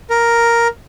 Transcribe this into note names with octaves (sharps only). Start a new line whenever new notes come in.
A#4